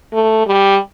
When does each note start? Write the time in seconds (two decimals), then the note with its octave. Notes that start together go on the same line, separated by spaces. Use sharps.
0.13 A3
0.47 G3